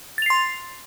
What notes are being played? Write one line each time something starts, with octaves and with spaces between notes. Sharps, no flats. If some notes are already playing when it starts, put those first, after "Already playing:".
C6 A6 C7 F7